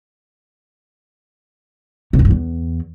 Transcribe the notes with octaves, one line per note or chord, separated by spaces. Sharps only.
C3
F2
G2
E2